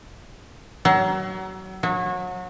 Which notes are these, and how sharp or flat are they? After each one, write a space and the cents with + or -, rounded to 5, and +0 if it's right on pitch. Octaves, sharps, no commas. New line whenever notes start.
F#3 +30
F#3 -30